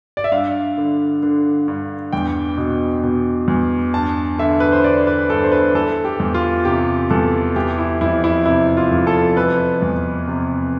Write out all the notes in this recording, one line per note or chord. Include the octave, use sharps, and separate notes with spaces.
D5
E5
G2 F5
D3
D3
G2
E2 G5
B2
B2
E2
G2 A5
D3 E5
B4
C5
D3 D5
B4
G2 A4
C5
B4
E3 A4
G4
E2
F4
C3 G4
E2 A4
E3 G4
E4
F2 E4
E4
C3 E4
F4
F2
A4
E3 B4
E2
C3